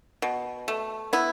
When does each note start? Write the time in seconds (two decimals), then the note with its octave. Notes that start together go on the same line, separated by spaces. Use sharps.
0.22 B2
0.68 A3
1.13 B3 E4